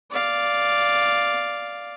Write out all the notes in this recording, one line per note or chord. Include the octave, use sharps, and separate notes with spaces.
D5 F5